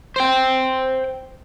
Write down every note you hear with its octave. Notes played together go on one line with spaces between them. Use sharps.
C5 G5